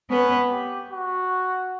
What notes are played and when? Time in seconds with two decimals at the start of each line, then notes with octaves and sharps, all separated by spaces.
0.10 B3 C#4 B4
0.51 G4
0.91 F#4